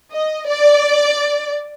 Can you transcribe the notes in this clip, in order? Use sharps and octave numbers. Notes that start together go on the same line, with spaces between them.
D#5
D5